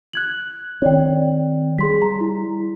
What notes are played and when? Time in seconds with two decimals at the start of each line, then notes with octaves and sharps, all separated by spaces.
0.13 F#6 G#6 F#7
0.82 D#3 C4 C#5 D5 G5
1.78 G3 G#4 C6 B6
2.02 A#5
2.21 E4